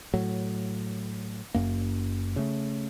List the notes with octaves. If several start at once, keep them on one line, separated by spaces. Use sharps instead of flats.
A2 F#3
F#1 F#2 A#3
C#3 A3